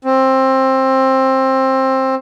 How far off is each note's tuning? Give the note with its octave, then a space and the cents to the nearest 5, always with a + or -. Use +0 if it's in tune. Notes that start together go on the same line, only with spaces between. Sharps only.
C4 +20